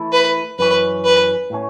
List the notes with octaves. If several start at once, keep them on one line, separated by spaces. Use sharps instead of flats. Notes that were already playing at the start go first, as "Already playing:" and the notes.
Already playing: E3 A3 E4 A4
B4
F#2 E3 C#4 B4
B4
A2 A3 C#4